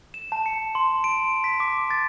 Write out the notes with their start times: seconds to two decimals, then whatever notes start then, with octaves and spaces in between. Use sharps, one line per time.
0.14 E7
0.32 A5
0.46 C#7
0.75 C6
1.04 D7
1.44 B6
1.60 D6
1.91 A6